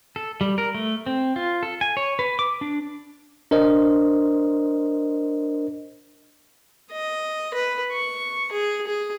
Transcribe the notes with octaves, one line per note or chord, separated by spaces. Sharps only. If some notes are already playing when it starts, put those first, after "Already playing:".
A4
G3
A#4
A3
C4
F4
A4
G#5
C#5
B4
D6
D4
D4 A#4 C5 D#5
D#5
B4
C#6
G#4
G#4